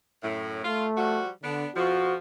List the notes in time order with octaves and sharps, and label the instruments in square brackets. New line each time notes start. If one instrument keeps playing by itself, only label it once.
[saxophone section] F#2 A2
[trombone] A3 [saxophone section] F4
[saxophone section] F3 G3 F#4
[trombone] D3 [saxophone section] B3 D4
[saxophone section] F2 B2 F3 [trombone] F#4